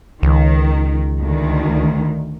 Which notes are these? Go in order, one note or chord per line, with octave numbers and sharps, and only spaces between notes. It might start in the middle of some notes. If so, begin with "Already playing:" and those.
C#2 D#3
D2 D#3